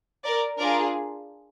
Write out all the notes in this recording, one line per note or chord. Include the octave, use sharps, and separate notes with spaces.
A#4 D5
D4 F4 G#4 A#4 D5